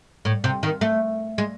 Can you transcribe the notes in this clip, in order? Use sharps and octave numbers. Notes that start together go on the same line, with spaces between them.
A2
C3
D#3
A3
G#3